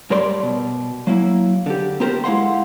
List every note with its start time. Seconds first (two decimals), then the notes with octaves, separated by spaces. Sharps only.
0.10 G2 G3 A#4 C#5 D5 C6
0.43 B2
1.07 F#3 A#3 E4
1.66 D3 G4
2.00 A#3 B3 F4 G4 A#4 C5
2.24 G#3 E4 F5 F#5 C6